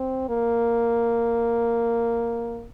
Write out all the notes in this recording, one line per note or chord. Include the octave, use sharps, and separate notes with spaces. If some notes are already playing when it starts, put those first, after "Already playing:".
Already playing: C4
A#3